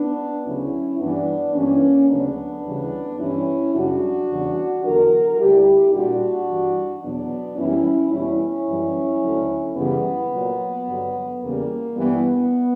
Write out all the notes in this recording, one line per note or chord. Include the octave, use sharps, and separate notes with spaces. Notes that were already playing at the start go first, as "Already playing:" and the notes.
Already playing: B3 D4
D2 C#3 F#3 C#4 E4
G2 E3 G3 B3 D4
G2 E3 G3 A#3 C#4
D2 C#3 F#3 B3 D4
D2 C#3 E3 G3
G2 E3 G3 C#4 E4
F#2 C#3 G3 D4 F#4
E2 C#3 E3 G3
E2 D3 F#3 F#4 A#4
D2 D3 G3 E4 G4
A#2 G3 D4 F#4
G2 E3 G3
E2 B2 F#3 B3 D4
F#2 E3 G3 C#4 E4
E2 B2 G3 C#4 E4
F#2 E3 G3
D2 D3 F#3
F#2 C#3 E3 G3 B3
A#2 F#3
G2 D3 F#3
E2 C#3 G3 A#3
G2 E3 G3 B3